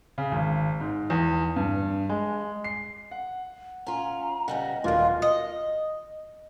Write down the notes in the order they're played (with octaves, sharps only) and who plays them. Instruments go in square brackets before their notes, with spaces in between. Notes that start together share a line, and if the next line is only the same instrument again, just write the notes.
[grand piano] C#3
G#1
G#2
E2
G2
G#3
C7
F#5
[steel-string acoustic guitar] C#4 F4 [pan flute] A#5
[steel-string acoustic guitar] C#3 G3 B3 [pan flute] D#5 [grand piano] F#5
[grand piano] D#1 D#3 [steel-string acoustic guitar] B2 G#3 [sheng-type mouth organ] F4
[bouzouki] D#5